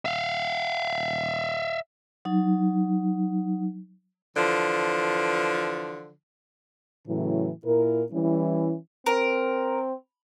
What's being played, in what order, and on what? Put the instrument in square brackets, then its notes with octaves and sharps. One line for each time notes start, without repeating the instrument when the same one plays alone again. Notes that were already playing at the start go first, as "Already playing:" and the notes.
[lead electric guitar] E5 F5
[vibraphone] F#3 D#4
[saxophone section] D3 E3 F3
[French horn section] A2 C#3 E3 F#3
A#2 E4 A#4
E3 G3 C#4 E4
[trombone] C4 [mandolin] A#4